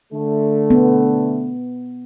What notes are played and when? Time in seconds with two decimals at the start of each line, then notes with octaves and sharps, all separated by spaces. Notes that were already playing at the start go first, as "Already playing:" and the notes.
0.13 D3 A3
0.71 B3